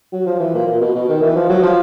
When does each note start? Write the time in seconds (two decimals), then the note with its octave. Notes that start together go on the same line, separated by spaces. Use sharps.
0.13 F#3
0.26 F3
0.40 E3
0.54 A#2
0.67 A#2
0.81 B2
0.95 B2
1.09 D#3
1.22 E3
1.36 F3
1.49 F#3
1.63 F3